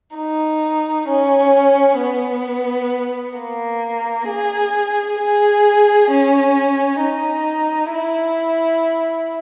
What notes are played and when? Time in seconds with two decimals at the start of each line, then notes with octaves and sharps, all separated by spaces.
0.17 D#4
1.08 C#4
2.00 B3
3.37 A#3
4.28 G#4
5.19 G#4
6.11 C#4
7.02 D#4
7.94 E4